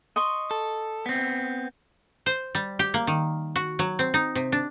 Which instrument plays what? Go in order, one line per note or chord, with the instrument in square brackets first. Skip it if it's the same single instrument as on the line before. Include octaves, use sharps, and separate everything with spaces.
[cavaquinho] D#5 C6 C#6
[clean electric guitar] A4
B3 C4
[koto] C5
G3
G4
A#3
D#3
F#4
F#3
C4
D#4
C3
D4